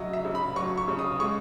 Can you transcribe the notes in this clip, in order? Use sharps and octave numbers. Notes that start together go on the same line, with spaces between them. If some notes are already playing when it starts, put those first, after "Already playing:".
Already playing: C#3 F#3 D#5 E5
E5
C#3
B5
F#3 C#6
C#6
C#3
D#6
D#6
G#3 C#6